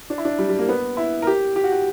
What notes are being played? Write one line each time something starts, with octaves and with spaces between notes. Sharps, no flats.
D4
E4
D4
G3
G3
A#3
B3
E4
A#4
G4
G4
F#4
G4